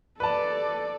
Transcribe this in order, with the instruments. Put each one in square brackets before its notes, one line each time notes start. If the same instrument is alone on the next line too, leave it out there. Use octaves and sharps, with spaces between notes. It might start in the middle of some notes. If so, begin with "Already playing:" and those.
[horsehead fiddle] A4 D5 [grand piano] B4 A5